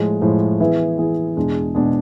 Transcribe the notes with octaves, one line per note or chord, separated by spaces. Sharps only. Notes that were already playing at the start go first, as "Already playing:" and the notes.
Already playing: A2 F3 G#3
A2 F3 G#3
E3 B3 E4 G#4
E3 B3 E4 G#4
E2 B2 G#3 D4 G#4
B2 G#3 D4 G#4